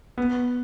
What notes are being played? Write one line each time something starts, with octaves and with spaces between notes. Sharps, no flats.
B3